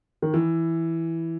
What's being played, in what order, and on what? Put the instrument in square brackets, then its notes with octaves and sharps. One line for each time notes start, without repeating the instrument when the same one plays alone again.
[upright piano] D#3
E3